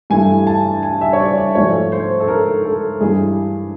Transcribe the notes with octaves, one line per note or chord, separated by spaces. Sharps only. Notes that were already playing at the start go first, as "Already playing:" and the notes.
G2 E3 A3 G#5
A5
G#5
E5
C#5
D5
D5
G#2 F3 A3 C#5
C5
A4
A#4
A4
G2 E3 G#3 G#4